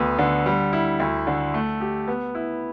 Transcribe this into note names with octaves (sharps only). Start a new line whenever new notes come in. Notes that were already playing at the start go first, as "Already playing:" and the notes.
Already playing: D2 B3
D3
G3
E4
D2
D3
A3
G4
B3
E4